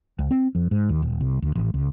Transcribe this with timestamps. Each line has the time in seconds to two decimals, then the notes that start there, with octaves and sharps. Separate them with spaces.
0.19 C#2
0.31 C4
0.55 F2
0.71 G#2
0.89 D#2
1.02 D#1
1.21 C2
1.42 D2
1.55 A1
1.74 C#2